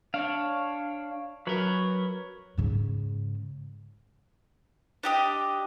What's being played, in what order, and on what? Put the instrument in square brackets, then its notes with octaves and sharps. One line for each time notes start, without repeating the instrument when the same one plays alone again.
[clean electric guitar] D4 [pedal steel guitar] C#5 F5
[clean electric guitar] F#3 A#4 [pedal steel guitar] B4 C#5 B5
[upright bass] G#2 C#3
[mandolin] D4 G4 D#5